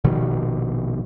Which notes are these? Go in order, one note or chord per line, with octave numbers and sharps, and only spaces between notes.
A#1 B2 D#3 G3